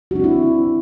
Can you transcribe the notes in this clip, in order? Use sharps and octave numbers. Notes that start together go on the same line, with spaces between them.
C4 D4 E4 F#4